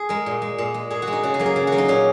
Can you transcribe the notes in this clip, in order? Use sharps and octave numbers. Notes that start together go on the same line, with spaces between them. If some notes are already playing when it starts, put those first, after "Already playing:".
Already playing: G#4
G#3 A#4
A#2
G#3
A#2
G#3
A#2 G#4
F#4
G#3
D#4
C#3 F#4
G#4
F#3 A#3
G#4
C#3
F#4
F#3 A#3
D#4
A#2 C#4